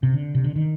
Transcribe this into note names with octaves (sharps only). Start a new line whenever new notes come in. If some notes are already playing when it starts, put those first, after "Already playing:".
C3
D3
C3
D3
D#3